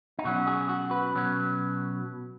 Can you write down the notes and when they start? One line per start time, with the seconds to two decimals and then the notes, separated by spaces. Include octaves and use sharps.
0.19 D#4
0.24 B2 F#3 C#4 F#4
0.47 G#4
0.69 F#4
0.91 B4
1.14 B2 F#3 C#4